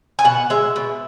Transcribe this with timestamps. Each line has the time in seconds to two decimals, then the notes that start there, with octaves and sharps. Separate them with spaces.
0.19 G#5
0.24 B2 F#5
0.50 G#3 E5
0.76 B2